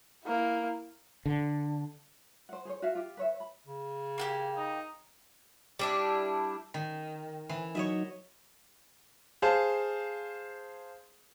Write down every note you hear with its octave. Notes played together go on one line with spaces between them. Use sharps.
A#3 E4
D3
C5 F#5
G#4 C5 C#5
F#4 C#5 E5 F5
F4 G4
B4 C#5 E5
B5
C#3
A#3 F#4 G4
D#4
G3 D4 E4
D#3
E3
F#3 D#4 C#5 D#5 E5
G#4 C5 F5 A5